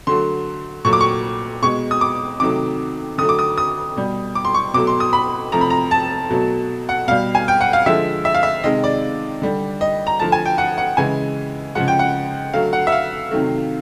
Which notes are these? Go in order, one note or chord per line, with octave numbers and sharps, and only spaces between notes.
D3 F#3 A3 C6
A#2 F#3 A3 C#6
D6
C#6
B2 G#3 C#6
D#6
D6
C3 D#3 F#3 A3 D6
D3 F#3 A3 D#6
D6
D#6
D#6
B2 G3
D6
C6
C#6
B2 F#3 A3 D6
C6
D#6
B5
C3 F3 A3 A#5
B5
A#5
A5
B2 F#3 A3
F#5
B2 G3 F5
G#5
G5
F#5
F5
D3 F3 G#3 E5
E5
F5
E5
C3 D#3 G#3 D#5
D5
D3 G3
D#5
A#5
D3 F3 A3 A5
G#5
G5
F#5
F#5
C#3 E3 G#3 G#5
C#3 F3 G#3 F#5
G5
F#5
D3 F#3 A3 F5
F#5
E5
F5
C3 D#3 F#3 A3